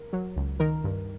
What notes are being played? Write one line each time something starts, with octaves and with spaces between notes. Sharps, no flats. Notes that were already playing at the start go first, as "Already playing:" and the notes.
Already playing: A#4
F#3
C#2
D#3 A#4
G2